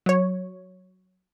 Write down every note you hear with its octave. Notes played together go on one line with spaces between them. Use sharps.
F#3 C#5